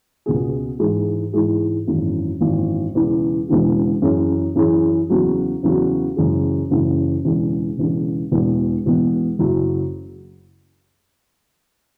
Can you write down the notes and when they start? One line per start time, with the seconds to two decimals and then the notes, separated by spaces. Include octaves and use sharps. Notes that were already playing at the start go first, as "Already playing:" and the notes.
0.26 C#2 B2 B3 G#4
0.79 G#2 E3 G#3 E4 G#4
1.33 G#2 E3 G#3 E4 G#4
1.87 G#1 F#2 E3
2.41 G#1 F#2 E3
2.94 E1 E2 C#3 E3
3.48 E1 E2 C#3 E3
4.02 F#2 E3 C#4 E4 G#4
4.56 F#2 E3 C#4 E4 G#4
5.09 E2 C#3 F#3 B3 F#4
5.63 E2 C#3 F#3 B3 F#4
6.17 F#1 F#2 E3 G#3
6.70 F#1 F#2 E3 G#3
7.25 E1 E2 C#3
7.78 E1 E2 C#3
8.32 E1 E2 B2 B3
8.86 E1 E2 B2 B3
9.39 F#1 F#2 C#3 F#3 E4